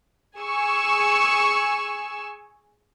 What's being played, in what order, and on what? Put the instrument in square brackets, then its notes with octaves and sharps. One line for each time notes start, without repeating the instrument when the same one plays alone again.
[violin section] G#4 G#5 C#6 E6